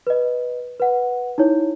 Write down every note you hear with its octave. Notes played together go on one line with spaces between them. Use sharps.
B4 D#5
B4 F#5
D#4 E4 C#5